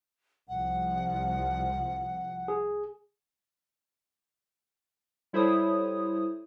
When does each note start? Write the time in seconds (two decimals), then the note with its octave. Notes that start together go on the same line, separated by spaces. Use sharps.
0.49 C2 F3 F#5
2.48 G#4
5.33 G3 E4 A4 C5 C#5 D#6